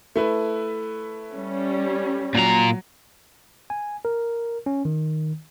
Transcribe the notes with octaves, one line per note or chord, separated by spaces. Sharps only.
A3 E4 B4
G3 C#4
A#2 F#3 A#5
G#5
A#4
C#4
D#3